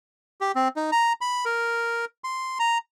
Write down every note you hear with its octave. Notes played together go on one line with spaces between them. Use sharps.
G4
C4
D#4
A#5
B5
A#4
C6
A#5